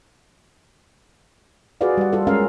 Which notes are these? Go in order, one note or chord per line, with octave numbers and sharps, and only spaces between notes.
F4 F#4 G#4 B4 D5 F5
G3 F#5
F4 A4
G#3 C#4 A#4 F5